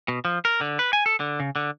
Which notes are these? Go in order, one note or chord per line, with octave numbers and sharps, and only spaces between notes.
B2
F3
A#4
D3
B4
G#5
A4
D3
C#3
D3